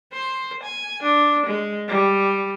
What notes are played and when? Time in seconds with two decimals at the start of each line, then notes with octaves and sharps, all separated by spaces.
0.13 C5
0.63 G#5
1.03 D4
1.46 G#3
1.88 G3